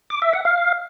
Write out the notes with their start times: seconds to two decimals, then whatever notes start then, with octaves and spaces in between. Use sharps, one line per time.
0.10 D6
0.22 E5
0.33 F#5
0.45 F5